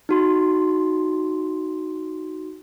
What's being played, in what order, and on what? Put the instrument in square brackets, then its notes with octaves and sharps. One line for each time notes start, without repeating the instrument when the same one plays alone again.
[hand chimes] D#4 F#4 C6